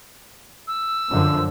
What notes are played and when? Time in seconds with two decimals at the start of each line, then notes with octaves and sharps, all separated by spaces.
0.67 E6
1.10 F#2 D3 F3